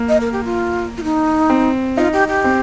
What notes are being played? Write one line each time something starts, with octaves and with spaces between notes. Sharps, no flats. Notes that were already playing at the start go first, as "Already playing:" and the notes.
Already playing: A#3
D#5
A#4
G4
F4
F4
D#4
C4
D#4 F4
G4
G4
C4